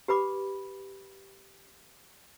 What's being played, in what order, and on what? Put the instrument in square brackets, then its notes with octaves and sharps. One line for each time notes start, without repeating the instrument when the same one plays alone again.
[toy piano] G4 B4 B5 D6